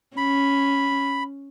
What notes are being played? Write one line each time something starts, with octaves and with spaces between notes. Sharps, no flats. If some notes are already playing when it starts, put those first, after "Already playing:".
C#4 B5